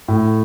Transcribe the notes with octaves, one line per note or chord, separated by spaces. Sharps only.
A2